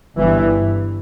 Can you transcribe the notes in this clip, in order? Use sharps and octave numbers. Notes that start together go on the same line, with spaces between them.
G1 G2 E3